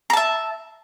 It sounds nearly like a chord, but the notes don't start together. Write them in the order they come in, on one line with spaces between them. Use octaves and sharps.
A#5 A5 E5